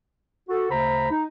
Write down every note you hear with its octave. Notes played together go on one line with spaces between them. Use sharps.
F#4 A4
D2 C#3 C5 A#5 B5
D#4